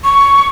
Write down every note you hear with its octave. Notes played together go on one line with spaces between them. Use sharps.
C#6